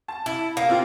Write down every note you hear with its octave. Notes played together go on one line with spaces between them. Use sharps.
A5
E4
A#3
C3 C4 F4